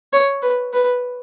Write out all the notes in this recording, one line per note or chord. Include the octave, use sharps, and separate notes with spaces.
C#5
B4
B4